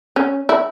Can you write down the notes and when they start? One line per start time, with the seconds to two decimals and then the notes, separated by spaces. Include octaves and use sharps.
0.16 C#4
0.49 E4